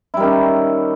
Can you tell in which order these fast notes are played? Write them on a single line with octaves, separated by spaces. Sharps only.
E4 G3 D#3 C#4